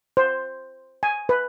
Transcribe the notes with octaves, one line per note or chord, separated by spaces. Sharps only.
C5
G#5
B4